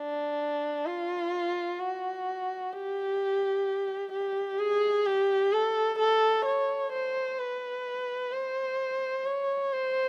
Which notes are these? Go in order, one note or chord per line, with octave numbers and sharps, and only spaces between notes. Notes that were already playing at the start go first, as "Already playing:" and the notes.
Already playing: D4
F4
F#4
G4
G4
G#4
G4
A4
A4
C#5
C5
B4
C5
C#5
C5